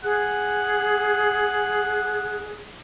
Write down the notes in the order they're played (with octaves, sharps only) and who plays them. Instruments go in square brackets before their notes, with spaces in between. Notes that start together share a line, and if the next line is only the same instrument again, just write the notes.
[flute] G#4 [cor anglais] F#5